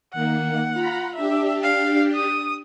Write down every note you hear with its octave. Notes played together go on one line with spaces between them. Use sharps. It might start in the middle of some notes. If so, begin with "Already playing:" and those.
D#3 A#3 F#5
F4 A#5 B5
D4 G4 E5
F5
D#6